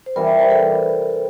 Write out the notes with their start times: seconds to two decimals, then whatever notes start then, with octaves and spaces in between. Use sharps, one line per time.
0.06 C5
0.16 C3 E3 G3 A#4
0.28 C5
0.38 A#4
0.51 A4